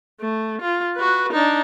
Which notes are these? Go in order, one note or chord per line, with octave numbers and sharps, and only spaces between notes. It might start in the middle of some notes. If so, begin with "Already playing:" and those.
A3
F4
F#4 B4
D4 D#4